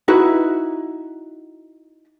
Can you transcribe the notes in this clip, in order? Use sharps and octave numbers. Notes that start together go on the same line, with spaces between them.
D#4 E4 F#4 B4